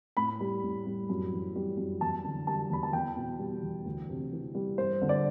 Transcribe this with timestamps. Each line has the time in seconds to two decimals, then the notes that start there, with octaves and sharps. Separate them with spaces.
0.17 A2 B5
0.40 G3
0.63 A2
0.86 G3
1.10 F#2
1.32 E3
1.56 G3
1.78 F#2
2.01 E2 A5
2.24 D3
2.47 G3 A5
2.70 E2 B5
2.83 A5
2.93 E2 G5
3.16 B2
3.39 G3
3.63 E2
3.85 D2
4.09 C3
4.32 E3
4.55 G3
4.78 G2 C5
5.02 D3
5.09 D5